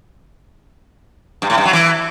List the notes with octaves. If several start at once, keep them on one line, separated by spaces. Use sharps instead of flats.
G2
A2
G2
F#3
E3